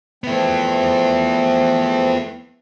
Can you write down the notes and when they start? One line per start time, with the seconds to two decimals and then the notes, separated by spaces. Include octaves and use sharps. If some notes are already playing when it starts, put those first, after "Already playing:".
0.24 F3 A3 B3 C4 E4